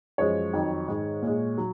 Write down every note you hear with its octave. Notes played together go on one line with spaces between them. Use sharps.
F#2 F3 G#3 C#5
F2 D#3 F#3
G#2 D#3 G#3
A#2 G#3
F#3